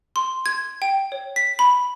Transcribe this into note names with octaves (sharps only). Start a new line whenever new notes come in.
C6
G#6
G5
C#5
B6
B5